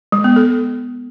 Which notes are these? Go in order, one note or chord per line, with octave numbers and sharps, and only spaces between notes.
G#3
B3
A4